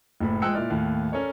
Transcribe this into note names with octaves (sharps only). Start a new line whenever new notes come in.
F#1 A2 B5
F3 G#3 G5 E6 F#6 C#7
A#2 E4 D5 F6
D#2 A2
C#4 A4 A#4 C#5 D5